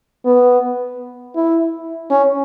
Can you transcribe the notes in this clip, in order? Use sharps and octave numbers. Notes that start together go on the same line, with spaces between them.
B3
E4
C#4